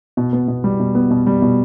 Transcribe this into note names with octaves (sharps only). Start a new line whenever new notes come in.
B2
B3
B2
G3
B2
B3
B2
G3
B2